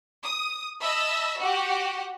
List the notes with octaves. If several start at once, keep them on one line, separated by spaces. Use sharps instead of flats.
D#6
D#5 E5 A5 B5 E6
F#4 G4 F#5